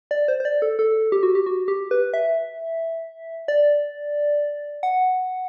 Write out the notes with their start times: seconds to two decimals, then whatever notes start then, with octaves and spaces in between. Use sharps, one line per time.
0.11 D5
0.28 C5
0.40 C5
0.45 D5
0.62 A4
0.79 A4
1.12 G4
1.23 F#4
1.35 G4
1.46 F#4
1.68 G4
1.91 B4
2.14 E5
3.48 D5
4.83 F#5